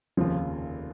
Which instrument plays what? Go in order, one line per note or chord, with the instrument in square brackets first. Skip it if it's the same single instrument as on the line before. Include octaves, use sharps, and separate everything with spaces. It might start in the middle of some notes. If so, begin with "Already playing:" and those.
[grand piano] F1 D#2 C#3 A#3 F4 [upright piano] F3